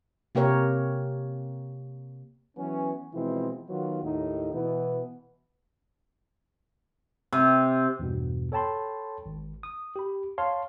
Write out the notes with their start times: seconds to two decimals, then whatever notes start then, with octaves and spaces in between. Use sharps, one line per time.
0.35 C3 A#3 G4 A#4 C#5
2.56 E3 F#3 B3 C#4
3.13 B2 E3 F3 G#3 C4 E4
3.68 D#3 F#3 B3 F4 F#4
4.03 D#2 A2 D#4
4.53 B2 E3 B3
7.33 C3
7.99 E2 G2 B2
8.52 A4 C#5 G5 A5 B5 C6
9.26 G#1
9.63 D#6
9.96 G4 B5
10.38 C#5 F5 A5 C6